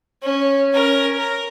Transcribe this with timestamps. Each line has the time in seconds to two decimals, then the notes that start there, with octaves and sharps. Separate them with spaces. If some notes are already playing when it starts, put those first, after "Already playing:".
0.22 C#4
0.73 C#4 A#4
1.18 A#4